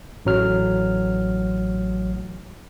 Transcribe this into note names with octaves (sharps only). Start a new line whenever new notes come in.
A1 F#3 F6